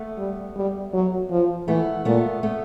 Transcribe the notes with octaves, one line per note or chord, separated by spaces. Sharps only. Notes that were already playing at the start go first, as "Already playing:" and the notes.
Already playing: A3 B3
G3
G3
F#3
F3
E3 A3 B3
A#2 A3 B3
A3 B3